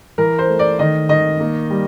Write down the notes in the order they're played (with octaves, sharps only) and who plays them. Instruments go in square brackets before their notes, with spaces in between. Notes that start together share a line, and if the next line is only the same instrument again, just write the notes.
[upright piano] E3 A#4
C5
A3
D5
D#3 D#5
D#3 D#5
A#3
G3